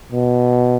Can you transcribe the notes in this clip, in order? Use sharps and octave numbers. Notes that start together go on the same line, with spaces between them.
B2